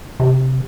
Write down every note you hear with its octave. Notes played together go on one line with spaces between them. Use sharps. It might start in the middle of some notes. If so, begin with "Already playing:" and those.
C3